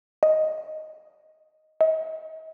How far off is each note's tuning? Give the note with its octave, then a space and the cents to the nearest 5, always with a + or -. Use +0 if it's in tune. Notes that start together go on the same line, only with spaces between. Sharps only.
D#5 +5
D#5 +40